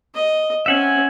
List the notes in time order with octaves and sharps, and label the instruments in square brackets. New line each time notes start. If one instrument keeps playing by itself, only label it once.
[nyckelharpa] D#5
[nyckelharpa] C4 C#4 [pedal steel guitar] E5 F#5 G#5